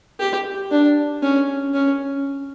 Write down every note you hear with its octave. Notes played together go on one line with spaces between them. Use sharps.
G4
D4
C#4
C#4